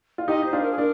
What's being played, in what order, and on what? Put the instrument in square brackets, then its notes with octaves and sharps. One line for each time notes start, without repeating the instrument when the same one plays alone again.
[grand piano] F4
[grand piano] D#4 G4 [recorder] D#5
[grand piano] D#4 [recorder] C5
[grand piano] D4 F4
[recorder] A#4
G#4
[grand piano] D4 [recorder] A#4